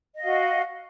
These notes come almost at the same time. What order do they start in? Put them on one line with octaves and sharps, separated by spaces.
D#5 F5 F#4